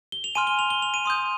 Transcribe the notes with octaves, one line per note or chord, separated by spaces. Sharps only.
G7
F7
G#5 C6 F6 D#7
G7
F7
G7
F7
D#7
C6 D#6 G6